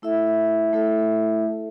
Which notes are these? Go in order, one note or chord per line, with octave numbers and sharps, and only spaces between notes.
A3 E4 A4 E5
A3 E4 A4 E5